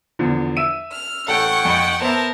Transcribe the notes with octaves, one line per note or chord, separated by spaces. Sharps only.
E2 D3 F3
E5 E6 D#7
F6
A1 A4 F#5 G5 C#6
F2 G#3 B5
B3 A#4 C5 E5 A5